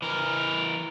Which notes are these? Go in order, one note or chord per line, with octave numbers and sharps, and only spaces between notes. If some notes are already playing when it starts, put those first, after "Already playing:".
E3 A#4